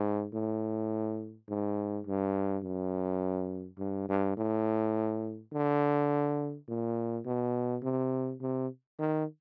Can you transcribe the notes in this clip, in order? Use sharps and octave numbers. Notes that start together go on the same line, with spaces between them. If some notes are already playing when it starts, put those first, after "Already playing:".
Already playing: G#2
A2
G#2
G2
F#2
G2
G2
A2
D3
A#2
B2
C3
C3
D#3